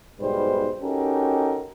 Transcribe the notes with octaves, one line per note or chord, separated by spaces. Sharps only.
B1 G#2 B2 G3 B4 C5
C#4 D#4 F#4 G4 A4 A#4